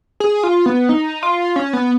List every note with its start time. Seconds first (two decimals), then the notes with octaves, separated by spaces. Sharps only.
0.20 G#4
0.43 F4
0.66 B3
0.89 D#4
1.23 F4
1.56 C#4
1.73 B3